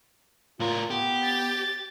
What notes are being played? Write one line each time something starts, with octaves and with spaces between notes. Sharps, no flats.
A2 F4 A#4
B3 G4
A6